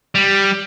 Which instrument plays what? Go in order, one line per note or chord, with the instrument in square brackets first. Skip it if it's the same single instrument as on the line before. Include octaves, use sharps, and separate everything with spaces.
[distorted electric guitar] G3